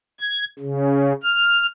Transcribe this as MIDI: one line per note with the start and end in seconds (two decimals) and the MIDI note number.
0.21 0.45 92
0.59 1.12 49
1.23 1.66 89